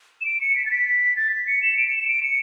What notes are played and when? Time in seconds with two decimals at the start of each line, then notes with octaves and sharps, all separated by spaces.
0.21 E7
0.25 D7
0.41 C#7
0.56 B6
0.66 A6
0.71 B6
1.16 A6
1.32 B6
1.47 C#7
1.62 E7
1.77 D7
1.88 C#7
1.97 E7
2.08 D7
2.23 C#7